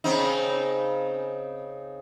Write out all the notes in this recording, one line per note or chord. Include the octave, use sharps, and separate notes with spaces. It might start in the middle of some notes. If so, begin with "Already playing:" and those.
C#3 C4 D#4